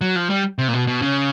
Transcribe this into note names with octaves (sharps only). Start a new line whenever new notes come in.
F#3
F3
G3
C3
A#2
B2
B2
C#3